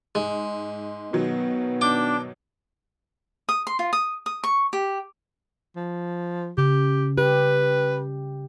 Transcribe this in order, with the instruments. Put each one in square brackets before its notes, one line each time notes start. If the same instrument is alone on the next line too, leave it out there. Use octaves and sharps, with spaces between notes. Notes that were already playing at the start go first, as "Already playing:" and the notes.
[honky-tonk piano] G#2 [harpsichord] G#3
[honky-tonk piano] B2 D#3 F#3 [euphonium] B3
[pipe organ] D4 [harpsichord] G5 D6
[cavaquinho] D#6
C6
F4
D#6
D#6
C#6
G4
[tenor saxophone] F3
[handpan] C#3 [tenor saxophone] G4
[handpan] G4 [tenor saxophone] B4